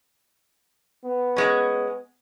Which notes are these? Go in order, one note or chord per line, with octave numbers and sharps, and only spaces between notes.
B3
G#3 C#4